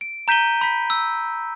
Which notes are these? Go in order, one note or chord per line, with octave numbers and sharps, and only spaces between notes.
D7
A#5 G6 B6 D#7 G7
B5 B6
E6